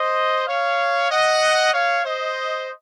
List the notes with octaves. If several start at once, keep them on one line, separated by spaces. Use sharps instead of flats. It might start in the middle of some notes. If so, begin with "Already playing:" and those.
Already playing: C5 D#5
C#5 F5
D#5 F#5
C#5 F5
C5 D#5